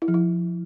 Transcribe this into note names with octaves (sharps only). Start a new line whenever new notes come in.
E4
F3
E4